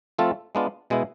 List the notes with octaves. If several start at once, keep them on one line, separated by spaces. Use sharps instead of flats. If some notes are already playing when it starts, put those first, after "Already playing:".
F3 A3 C4 F4 A4
G#3 B3 D4 F4
B2 G#3 B3 E4